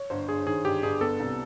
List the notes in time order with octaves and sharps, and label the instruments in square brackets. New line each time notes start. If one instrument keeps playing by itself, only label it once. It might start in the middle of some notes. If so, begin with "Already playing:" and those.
Already playing: [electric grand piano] C#5
[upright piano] G1 [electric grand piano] C5
[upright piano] G2 [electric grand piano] G#4
[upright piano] D#3 [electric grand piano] G#4
[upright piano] G1 [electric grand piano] G4
[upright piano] G1 [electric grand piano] G#4
[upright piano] B3 [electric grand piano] A4
[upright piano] C2